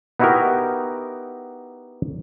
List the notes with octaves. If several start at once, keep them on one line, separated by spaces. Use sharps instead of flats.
B3 D#4 E4 F#4 G4 A#4